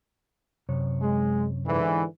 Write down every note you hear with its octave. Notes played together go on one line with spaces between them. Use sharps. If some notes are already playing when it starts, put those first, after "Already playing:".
F#2 C3 C#5
G#3
G#2 D3 E3